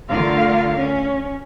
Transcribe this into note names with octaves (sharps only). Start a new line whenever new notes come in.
D3 A3 F4 A#4 F5
C#4